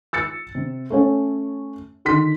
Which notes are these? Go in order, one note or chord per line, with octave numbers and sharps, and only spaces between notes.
E6 A6 C#7
C3
A3 C#4 C#5
D3 D#3 C6 B6